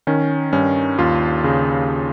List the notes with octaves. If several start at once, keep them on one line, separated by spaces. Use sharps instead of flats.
D#3 C#4
G2 C#4
D#2 F4
C#3